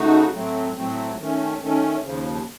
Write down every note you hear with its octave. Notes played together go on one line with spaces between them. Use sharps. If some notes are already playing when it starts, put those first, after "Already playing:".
Already playing: C#3 A3 D#4 F#4
A2 F#3 A3 C4
A2 F#3 A3 C4
D#3 A3 C#4
D#3 A3 C#4
D#2 C#3 F3